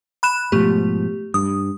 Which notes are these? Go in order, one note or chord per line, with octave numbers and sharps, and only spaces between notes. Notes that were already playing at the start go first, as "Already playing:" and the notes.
B5 F#6 E7
G#2 B2 F3 A3 G4
G2 D#6